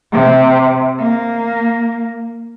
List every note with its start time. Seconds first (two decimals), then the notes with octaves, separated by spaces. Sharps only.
0.12 C3
0.98 A#3